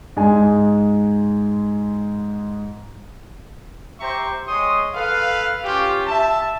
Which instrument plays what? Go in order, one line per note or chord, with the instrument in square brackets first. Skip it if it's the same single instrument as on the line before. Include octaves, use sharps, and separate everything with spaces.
[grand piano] G#2 G#3 G#5
[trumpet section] G4 C5 E5 A#5 C#6
G#3 C#5 C6 D#6
A4 B4 F5
C#4 F4 G4
E5 A5